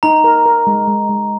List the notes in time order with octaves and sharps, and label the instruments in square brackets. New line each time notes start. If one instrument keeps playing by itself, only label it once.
[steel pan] D#4 [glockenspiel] A#5
[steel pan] A#4
A#4
G#3
G#3
G#3